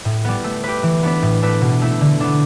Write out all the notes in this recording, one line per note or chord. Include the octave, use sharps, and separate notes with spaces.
A2
G3 B3
A3
G4 B4
E3
B3 D4 B4
A2
A3 D4 B4
B2
A3 E4
D3
B3 D4